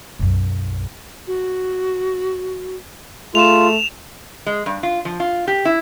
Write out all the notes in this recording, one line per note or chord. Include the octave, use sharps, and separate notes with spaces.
B1 F#2
F#4
A3 F4 G#4 E7 F7
G#3
G2
F4
F3
F4
G4
E4